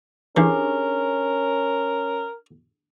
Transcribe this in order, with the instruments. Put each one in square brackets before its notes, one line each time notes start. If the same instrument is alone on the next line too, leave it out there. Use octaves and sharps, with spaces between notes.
[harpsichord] E3 [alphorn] C#4 [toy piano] D4 G4 G#4 [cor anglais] A#4